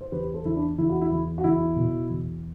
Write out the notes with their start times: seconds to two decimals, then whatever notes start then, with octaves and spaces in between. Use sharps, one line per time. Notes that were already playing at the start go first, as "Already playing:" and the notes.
0.01 C5
0.12 E2 G4 B4
0.34 A4 C5
0.45 E2 E4
0.56 D4
0.78 E2 E4
0.90 F#4
1.01 E4
1.11 E2
1.38 F#4
1.44 E2 E4
1.76 B2
2.10 E2